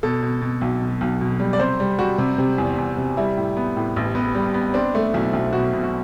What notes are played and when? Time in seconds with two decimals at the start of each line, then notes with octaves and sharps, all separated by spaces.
0.03 B2 A4
0.23 B2
0.41 B2
0.61 B1
0.81 B2
1.01 B1
1.21 B2
1.40 G3
1.53 D5
1.59 C3 C5
1.80 G3
1.99 G3 F#4
2.18 C3
2.38 C3
2.58 E2
2.78 E2
2.97 C3
3.17 G3 E4
3.37 A2
3.57 B3
3.77 A2
3.96 A1
4.15 B3
4.35 G3
4.54 B3
4.74 C4 D4
4.95 A3
5.14 B1 E4
5.33 B1
5.53 B2 F#4
5.73 B2
5.83 F#4